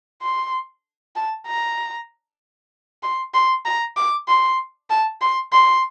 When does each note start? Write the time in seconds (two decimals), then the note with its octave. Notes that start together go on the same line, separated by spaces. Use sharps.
0.22 C6
1.16 A5
1.47 A#5
3.03 C6
3.34 C6
3.65 A#5
3.97 D6
4.28 C6
4.90 A5
5.21 C6
5.53 C6